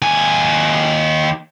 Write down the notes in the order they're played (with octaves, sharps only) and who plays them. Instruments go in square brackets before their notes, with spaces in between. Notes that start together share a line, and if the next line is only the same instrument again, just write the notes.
[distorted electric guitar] D#2 G#5